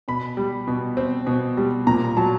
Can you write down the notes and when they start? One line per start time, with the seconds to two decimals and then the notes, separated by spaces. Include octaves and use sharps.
0.08 B2 B5
0.37 G3
0.68 B2
0.97 C4
1.27 B2
1.57 G3
1.87 A#2 A#5
2.17 F#3 A5